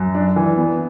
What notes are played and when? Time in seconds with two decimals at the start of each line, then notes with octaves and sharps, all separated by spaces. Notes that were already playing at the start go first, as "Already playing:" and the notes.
Already playing: F#2
0.15 D4
0.36 E3
0.57 B3